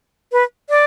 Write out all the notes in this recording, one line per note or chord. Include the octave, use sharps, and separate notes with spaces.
B4
D5